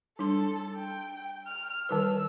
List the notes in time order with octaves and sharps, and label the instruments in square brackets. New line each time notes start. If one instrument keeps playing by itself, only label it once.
[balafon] G3 D4 C6 [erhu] A4
[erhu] G5
F6
[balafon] D#3 G3 B4 [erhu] E6